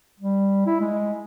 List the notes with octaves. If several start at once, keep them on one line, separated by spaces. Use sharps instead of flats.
G3
E4
G#3